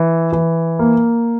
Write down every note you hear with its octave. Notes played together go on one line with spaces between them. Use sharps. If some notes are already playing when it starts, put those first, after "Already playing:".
Already playing: E3
E3
A#3